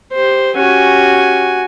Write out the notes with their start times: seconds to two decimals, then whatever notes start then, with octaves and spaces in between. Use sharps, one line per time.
0.13 G4 C5
0.56 C#4 F#4 G4 G#5